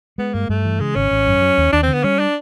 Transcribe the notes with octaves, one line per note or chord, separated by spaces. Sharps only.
G#3 B3
G2 A#3
G2 A3
E3
C#3 G#3
G#1 C#4
G#1
F#2
F#3
D#2
D#2 D4
C4
D3
B3
G3 C#4
D4